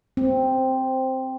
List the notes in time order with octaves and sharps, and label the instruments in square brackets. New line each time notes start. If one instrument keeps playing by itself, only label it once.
[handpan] C4